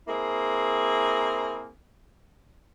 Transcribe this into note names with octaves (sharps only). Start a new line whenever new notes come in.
A#3 C4 E4 G#4